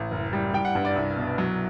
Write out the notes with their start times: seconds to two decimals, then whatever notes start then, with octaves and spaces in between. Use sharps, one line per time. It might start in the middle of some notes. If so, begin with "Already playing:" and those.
Already playing: A1
0.11 F#1
0.33 G3
0.54 G3 G5
0.65 F#5
0.75 G2
0.85 D5
0.96 C2
1.17 B2
1.38 F#3